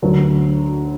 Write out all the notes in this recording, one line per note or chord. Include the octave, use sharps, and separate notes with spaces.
D2 D3 F#3